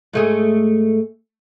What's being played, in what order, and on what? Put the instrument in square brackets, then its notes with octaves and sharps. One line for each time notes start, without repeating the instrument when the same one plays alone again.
[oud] G#2 A3 G#4